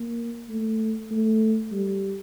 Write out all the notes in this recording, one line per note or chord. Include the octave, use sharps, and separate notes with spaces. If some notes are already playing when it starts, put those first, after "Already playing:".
Already playing: A#3
A3
A3
G3